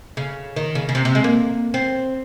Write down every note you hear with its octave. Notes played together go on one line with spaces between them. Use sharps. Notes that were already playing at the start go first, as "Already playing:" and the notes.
C#3
D#3
C#3
C#3
C3
C3
G#3
A#3
C4